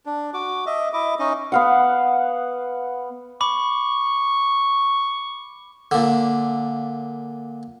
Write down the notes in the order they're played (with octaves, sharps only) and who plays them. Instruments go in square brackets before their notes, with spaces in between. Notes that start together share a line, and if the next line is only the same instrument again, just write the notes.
[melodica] D4
F#4 D6
D#5 E5
E4 D#5 E5 D6
C#4 D#4 D#5
[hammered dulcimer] B3 F5 F#5
[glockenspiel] B5 D6 [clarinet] C#6
[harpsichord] A#2 D3